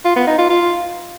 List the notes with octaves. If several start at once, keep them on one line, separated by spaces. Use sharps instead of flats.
F4
B3
D#4
F4
F4